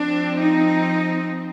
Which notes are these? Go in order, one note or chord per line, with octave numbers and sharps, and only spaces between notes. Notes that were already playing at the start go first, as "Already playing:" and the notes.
Already playing: F3 C4 D4
D#4